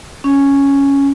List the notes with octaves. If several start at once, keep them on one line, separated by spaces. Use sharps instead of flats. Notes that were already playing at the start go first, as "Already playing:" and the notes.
C#4